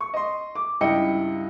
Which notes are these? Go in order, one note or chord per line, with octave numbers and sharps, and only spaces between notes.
C#6
D#5 C6
D6
C#2 G2 E4 D#5 G5 C#7